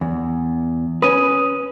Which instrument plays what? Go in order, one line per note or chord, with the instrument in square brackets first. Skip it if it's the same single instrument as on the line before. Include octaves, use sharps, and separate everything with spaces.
[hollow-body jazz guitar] E2
[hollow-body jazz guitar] C#4 B4 [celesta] D#6 D#7